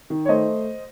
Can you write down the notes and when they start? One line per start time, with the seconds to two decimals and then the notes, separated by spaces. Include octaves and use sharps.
0.10 D#3
0.25 C#5
0.29 A3 C5 D#5